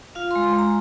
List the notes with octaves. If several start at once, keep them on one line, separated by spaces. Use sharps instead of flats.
F4 F5
C6
G#3
C6
G#3 A#5